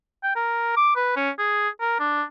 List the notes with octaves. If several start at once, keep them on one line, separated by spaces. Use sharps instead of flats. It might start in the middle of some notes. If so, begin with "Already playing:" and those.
G5
A#4
D6
B4
C#4
G#4
A#4
D4